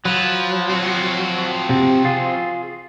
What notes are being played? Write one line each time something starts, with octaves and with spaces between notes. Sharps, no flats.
F3 F#3 B4
C4 F#4
C3
F4 G#4